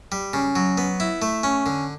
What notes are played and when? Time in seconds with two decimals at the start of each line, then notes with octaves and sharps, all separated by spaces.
0.12 G3
0.33 C#3
0.56 F#3
0.78 B3
1.00 E4
1.22 A3
1.43 C#4
1.66 D3